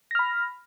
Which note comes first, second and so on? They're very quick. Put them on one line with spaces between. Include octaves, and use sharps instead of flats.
A#6 F6 B5